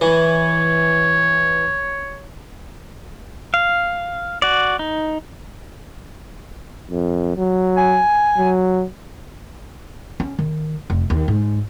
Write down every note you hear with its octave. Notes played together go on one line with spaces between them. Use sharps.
E3 C#5
F5
F#4 D5
D#4
F2
F#3
G#5
F#3
C#4
D#3
F1
D#2
G#2